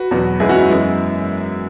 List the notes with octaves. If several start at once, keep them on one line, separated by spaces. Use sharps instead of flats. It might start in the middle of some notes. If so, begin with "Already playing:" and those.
Already playing: F#4 B4
E2 B2 F#3
F#2 E3 G#3 B3 E4 G#4
C#4 F#4
E4
F#2 E3 G#3 B3